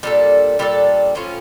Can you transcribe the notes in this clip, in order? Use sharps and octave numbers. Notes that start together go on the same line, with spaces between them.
A#2 G3 D4 A4
A#2 G3 D4 A4
A2 F3 C#4 F4